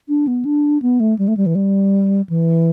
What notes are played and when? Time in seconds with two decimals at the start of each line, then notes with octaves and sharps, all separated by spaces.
0.08 D4
0.27 B3
0.45 D4
0.82 B3
1.00 A3
1.18 G3
1.28 A3
1.37 G3
1.46 E3
1.55 G3
2.29 E3